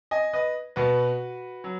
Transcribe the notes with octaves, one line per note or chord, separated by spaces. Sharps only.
D#5 G#5
B4 D#5
B2 B3 F#4 B4
F#3